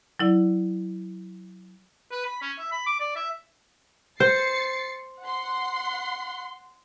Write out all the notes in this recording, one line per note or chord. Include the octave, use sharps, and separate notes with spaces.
F#3 E4 D5
B4
B5
C#4
E5
B5
D6
D5
E5
C5 A6 C7 C#7
F#5 C6